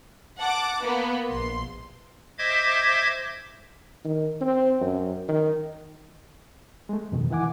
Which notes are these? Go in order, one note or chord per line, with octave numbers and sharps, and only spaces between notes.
F#5 A5 D6
A#3 B3 B4
A#1 C6
C5 D#5 E5 D6 G#6
D#3
C4
F#2
D#3
G#3 A3
F2 B2 D#3
D#3 E3 E4 F#5 G#5 D6